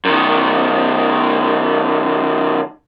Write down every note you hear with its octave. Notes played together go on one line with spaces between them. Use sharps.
F#2 D#3